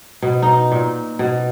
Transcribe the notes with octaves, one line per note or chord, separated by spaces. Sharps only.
B2
D#4
A#2
B2